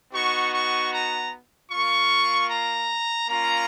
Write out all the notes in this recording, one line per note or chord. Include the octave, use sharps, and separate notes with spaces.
B3 D#4 F#4 C#6
C#6
A#5
A#3 F4 C#6
A#5
A#3 C#4 F4 A#5